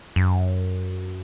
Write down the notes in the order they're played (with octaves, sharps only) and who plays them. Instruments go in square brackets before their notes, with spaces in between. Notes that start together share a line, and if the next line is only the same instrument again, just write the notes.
[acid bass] F#2